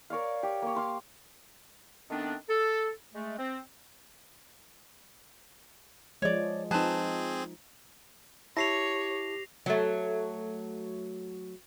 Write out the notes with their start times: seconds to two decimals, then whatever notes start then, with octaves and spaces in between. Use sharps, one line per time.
0.10 A#4 C#5 D5 F5
0.43 G4
0.62 A#3 C#5
0.75 F5 C6 D6
2.10 D#3 A3 B3 C4 D4
2.49 A4
3.14 G#3 A3
3.38 C4
6.22 F3 G#3 C#5 D5
6.71 F3 C4 D#4 G#4 B4 A5
8.57 E4 G4 C#5 A5 A#6 C7 F7
9.66 F#3 A3